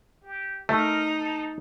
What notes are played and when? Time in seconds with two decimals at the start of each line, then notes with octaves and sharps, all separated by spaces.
0.23 G4
0.69 A3 D#4 A#4
1.17 A4